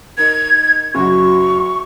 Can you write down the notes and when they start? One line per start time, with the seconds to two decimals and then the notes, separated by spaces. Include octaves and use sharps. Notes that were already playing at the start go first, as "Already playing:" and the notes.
0.18 D#4 A#4 G#6
0.95 F#1 F#3 F#4 C#6